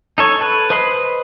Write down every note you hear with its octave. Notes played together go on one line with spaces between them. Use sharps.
D#4 A4 C#5
A4 B4
B4 C5 D#5 B5 C6